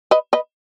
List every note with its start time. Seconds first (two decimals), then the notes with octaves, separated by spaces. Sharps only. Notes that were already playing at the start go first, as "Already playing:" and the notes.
0.11 B4 D#5
0.33 B4 D#5